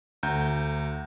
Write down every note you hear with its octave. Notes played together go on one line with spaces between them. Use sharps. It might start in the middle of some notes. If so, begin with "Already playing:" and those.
D2 A#5 G6